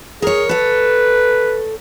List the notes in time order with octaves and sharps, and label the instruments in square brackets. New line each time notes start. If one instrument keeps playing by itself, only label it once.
[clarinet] G#4 [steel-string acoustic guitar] A#4 C#5
[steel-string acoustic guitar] A4 C#5 [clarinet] B4